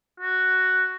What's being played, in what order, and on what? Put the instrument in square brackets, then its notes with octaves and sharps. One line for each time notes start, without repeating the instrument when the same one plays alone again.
[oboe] F#4